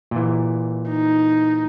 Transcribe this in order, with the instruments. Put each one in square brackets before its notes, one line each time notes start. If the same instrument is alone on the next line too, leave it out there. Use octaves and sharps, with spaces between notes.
[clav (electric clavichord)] A#2 E3
[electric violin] D#4